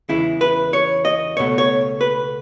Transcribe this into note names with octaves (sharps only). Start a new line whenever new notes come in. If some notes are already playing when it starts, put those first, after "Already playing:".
E2 C#3 E3 G#3 E4
B4
C#5
D#5
C#2 B2 A3 C#5
C#5
B4